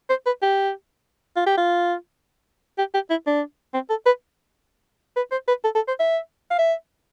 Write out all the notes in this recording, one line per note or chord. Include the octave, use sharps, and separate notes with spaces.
C5
B4
G4
F4
G4
F4
G4
G4
E4
D4
C4
A4
B4
B4
C5
B4
A4
A4
C5
E5
F5
E5